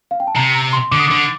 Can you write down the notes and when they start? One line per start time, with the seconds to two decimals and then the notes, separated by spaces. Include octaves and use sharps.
0.11 F5
0.20 G5
0.27 A5
0.36 C3 A#5
0.55 A#5
0.73 C6
0.91 D3 D6
1.00 D#6
1.08 D3 D6